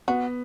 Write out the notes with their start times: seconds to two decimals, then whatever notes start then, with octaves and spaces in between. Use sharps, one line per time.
0.08 B3 F#4